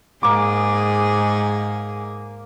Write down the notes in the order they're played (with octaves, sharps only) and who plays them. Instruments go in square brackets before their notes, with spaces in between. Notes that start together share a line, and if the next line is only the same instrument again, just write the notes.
[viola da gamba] G#2 G#4 [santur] A#3 D6